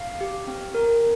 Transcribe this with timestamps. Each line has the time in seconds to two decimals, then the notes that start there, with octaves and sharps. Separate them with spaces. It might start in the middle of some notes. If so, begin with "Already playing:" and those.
Already playing: F5
0.21 G4
0.48 C4
0.75 A#4